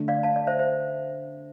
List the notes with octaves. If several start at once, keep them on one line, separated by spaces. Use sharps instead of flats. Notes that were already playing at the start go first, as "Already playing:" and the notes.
Already playing: D3 A3 D4
D5 F5
F5 A5
D5
C5 E5
C5 E5